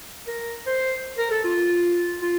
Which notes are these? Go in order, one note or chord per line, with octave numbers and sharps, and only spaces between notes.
A#4
C5
A#4
A4
F4
F4